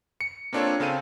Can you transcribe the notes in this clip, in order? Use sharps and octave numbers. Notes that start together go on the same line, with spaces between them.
C#7
A#3 C4 D4 F4 A4 C#5
C#3 C4 A4 F5 D#7